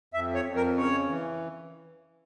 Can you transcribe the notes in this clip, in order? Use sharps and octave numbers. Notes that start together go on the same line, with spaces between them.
F2 E5
C#5
F2
A#4
C#3 C#5
E3